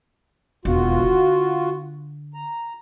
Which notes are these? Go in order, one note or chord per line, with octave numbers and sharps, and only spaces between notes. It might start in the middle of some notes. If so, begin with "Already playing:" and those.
E1 D#2 F4 F#4
D3
A#5